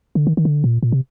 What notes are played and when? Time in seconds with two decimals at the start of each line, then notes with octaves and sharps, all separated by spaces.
0.15 D3
0.27 D#3
0.37 D#3
0.45 D3
0.64 A#2
0.83 A#2
0.92 C3